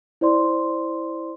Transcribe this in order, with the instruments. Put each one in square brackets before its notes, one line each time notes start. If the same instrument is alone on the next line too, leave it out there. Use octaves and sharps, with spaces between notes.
[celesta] E4 C5 D5 C6